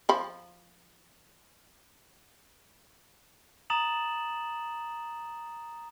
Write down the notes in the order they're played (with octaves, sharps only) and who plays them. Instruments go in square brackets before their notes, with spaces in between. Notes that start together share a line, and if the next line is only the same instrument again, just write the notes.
[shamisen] F3 B5
[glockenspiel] A#5 D#6 A6 E7 F#7